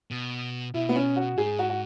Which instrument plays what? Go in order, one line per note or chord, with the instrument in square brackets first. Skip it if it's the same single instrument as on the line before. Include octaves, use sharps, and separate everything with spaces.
[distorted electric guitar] B2
[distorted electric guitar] B2 [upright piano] E4
[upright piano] B3
C#4
F#4
[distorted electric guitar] G#2 [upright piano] G#4
[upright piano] F#4
F#4